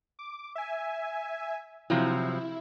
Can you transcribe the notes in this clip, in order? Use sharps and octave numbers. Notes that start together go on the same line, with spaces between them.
D6
E5 G#5
C3 F3 F#3 E4